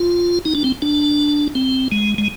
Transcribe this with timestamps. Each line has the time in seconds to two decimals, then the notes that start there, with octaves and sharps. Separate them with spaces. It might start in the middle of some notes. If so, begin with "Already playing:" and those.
Already playing: F4
0.45 D#4
0.55 D4
0.64 C4
0.82 D4
1.55 C4
1.92 G#3
2.18 G#3